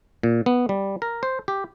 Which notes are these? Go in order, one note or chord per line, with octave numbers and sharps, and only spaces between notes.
A#2
B3
G3
A#4
C5
G4